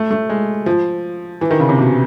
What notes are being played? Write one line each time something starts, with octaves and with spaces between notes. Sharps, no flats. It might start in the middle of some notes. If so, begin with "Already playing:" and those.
Already playing: A3
A3
G#3
F3
E3
D#3
C#3
C3
B2